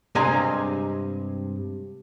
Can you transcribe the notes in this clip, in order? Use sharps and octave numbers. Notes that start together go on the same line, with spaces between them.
G2 C3 G#3 D#5 G#5 A#5